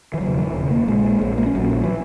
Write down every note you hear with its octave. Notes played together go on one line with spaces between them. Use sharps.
E3
E1 D#2 C#3 F#3
E3
E1 D#2 C#3
A#3
A#1 A#2 G#3
A#1 A#2 G#3
A#3
C#4
A#1 A#2 F#3
F#3
E3